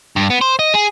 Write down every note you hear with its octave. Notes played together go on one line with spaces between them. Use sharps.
G2
B3
C5
D#5
G#4